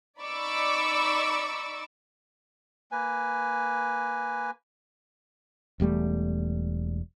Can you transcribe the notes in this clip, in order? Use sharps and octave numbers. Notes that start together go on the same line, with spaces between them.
D#4 D5 B5 C#6 D6 E6
A#3 B4 G#5
E1 E2 G3 A3